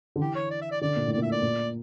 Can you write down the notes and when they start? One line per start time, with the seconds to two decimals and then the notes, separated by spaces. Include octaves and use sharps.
0.16 D3
0.20 E3 G4
0.35 C#5
0.51 D5
0.62 E5
0.71 D5
0.81 D3 D5
0.97 A#2
1.07 A2
1.12 D5
1.18 A#2 E5
1.32 D5
1.42 A#2